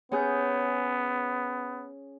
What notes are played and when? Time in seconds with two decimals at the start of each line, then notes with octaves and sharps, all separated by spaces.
0.12 B3 C#4 G#4 G6